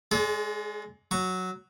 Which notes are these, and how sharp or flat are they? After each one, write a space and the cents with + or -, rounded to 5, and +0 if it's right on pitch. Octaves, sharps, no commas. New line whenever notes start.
G#3 +0 G#4 +45 D5 -40
F#3 +0 C#6 +0